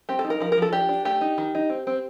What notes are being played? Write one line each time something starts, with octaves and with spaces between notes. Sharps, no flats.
C4 G4
A4
D#4
A#4
F3 A#4
A#4
F3 A4
D4 G4
D4
A3 G4
D#4
D#3
D#4
C4
C4